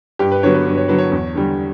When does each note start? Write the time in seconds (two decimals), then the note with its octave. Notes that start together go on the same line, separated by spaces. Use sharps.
0.19 G2 G4
0.32 B4
0.43 D3 F#3 B3 C#5
0.55 B4
0.66 G2
0.77 C#5
0.88 D3 F#3 B3 B4
0.98 C#5
1.12 E2
1.35 D3 G3